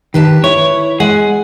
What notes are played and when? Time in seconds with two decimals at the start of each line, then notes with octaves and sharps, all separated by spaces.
0.14 D#3 G4 B4 A5
0.44 E4 C#5
1.00 G#3 G#4 F#5 G#5